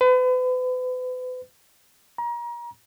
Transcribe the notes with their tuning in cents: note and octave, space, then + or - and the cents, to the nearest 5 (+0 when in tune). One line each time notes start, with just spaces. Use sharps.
B4 +40
A#5 +30